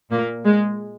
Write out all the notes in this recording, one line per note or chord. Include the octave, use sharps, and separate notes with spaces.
A#2 A#3
G#3